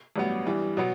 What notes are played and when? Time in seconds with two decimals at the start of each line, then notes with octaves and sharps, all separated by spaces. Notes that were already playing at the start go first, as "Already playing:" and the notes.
0.16 A1 G2 F#3 B3
0.46 G2 E3 G3
0.77 B2 F#3 B3